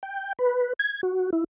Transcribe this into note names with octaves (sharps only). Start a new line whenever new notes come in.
G5
B4
G#6
F#4
E4